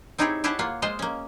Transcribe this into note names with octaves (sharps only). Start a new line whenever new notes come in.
C4 D#4 E4 G4 G#4 C#5
E4 G4 G#4 C#5 F#5 A5
A#3 F4 F#5
G#3 F4 C5 D#5
A#3 C#4